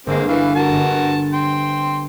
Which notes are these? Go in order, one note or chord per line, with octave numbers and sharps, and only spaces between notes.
G1 G#3 A#3 C4
E3 F5
F#4 A#4 A5
G1
G5 C6